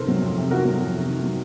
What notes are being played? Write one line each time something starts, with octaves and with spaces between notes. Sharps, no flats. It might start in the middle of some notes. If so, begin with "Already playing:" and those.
Already playing: F2 C3 D#3 A4 A#4 C5
F#3
F2
C3
D#3 F#4 A#4
F#3
F2
C3
D#3
F#3